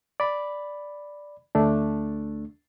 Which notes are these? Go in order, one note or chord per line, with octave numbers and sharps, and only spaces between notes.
D5 B5
D2 A3 D4